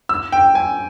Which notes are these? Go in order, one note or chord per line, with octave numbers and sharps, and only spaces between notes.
E6
G5
G#5